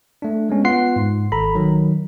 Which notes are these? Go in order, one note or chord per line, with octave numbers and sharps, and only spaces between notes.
A3 D4
G#3 B3 C#4 D4
B3 F4 F#5 C6 C7
G#2
G#1 A4 A#5 B5
D#3 F#3